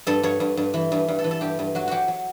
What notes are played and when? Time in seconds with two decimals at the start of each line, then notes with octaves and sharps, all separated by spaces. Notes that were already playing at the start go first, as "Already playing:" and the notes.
0.07 G2 A4
0.23 G2 C#5
0.40 G2
0.57 G2
0.74 E3
0.92 G2
1.08 G2
1.19 A4
1.24 E3
1.31 A4
1.41 G2 G4
1.59 G2
1.75 F#3 F#4
1.87 F#3 F#4 G4
2.08 F#3